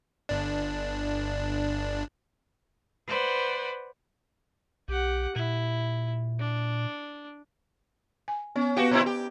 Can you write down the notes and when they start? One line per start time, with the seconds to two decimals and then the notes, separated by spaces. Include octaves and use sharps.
0.29 G1 D4
3.07 B4 C5 D5 F#5
4.88 B1 G4 F#5
5.36 A#2 E4
6.40 D4
8.28 G#5
8.56 B3 C#4
8.77 B3 F#4 G4 B4 F5
8.91 A#2 C4 E4
9.06 G4